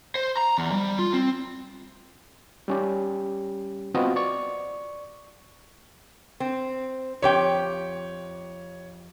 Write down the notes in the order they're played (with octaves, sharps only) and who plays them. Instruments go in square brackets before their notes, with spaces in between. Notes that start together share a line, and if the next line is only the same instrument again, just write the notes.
[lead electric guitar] C5
A#5
E2
G3
F4
C4
[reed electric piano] G3 C#4 G4
B3 C4 F4 F#4 B4 D#5
D5 C#6
[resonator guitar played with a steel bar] C4
[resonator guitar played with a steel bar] F2 G4 G5 [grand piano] C#5